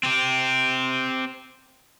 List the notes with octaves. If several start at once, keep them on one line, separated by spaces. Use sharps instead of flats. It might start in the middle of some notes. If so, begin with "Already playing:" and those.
C4 G4